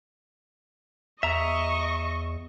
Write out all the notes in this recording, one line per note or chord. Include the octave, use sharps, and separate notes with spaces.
E2 D#5 E5 A#5 C#6